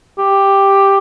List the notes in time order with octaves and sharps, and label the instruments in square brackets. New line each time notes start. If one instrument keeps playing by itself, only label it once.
[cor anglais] G4